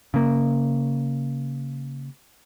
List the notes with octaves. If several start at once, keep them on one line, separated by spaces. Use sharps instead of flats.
C#3 A#3